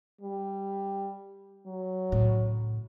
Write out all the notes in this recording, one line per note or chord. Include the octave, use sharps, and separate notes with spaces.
G3
F#3
A2 C#3